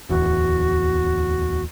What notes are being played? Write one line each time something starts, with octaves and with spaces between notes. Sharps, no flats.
D1 E2 F#4